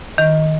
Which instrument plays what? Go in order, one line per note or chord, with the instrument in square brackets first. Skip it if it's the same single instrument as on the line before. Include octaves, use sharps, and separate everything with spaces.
[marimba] D#3